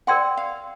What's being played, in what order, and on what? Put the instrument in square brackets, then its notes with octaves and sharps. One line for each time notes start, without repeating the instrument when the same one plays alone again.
[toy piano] A#4 D5 G5 C6 [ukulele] F#5
[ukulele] F5